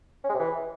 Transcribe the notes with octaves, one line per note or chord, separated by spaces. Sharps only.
C#4
G#3
C3
E3